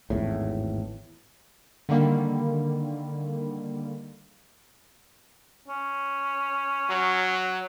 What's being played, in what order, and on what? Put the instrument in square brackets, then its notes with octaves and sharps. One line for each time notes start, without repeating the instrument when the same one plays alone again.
[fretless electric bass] G#1 E2 A2
[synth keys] D3 D#3 G3 A#3
[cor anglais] C#4
[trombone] F#3